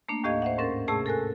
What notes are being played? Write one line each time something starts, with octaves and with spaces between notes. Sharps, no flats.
A3 A#3 D4
D#2 A2 G4 D#5 F5 G#6
C5 E5 F#5
G#2 C#4 A#4 A6
C3 A3 G#4 A5 C#6 E6
A4 A#4 G#5 F#6